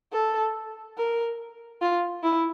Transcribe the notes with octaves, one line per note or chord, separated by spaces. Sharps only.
A4
A#4
F4
E4